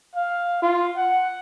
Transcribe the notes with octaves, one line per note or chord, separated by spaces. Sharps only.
F5
F4
F#5